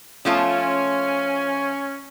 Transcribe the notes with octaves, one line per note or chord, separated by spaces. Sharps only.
F3 A3 C#4 F4